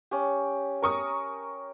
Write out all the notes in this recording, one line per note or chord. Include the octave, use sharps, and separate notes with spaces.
C#4 G4
A#4 C#6 D#6